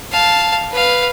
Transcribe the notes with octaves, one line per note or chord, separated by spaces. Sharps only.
F5 A5
B4 F5